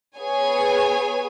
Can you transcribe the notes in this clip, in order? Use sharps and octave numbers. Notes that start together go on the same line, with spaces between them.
B3 G#4 C#5 G#5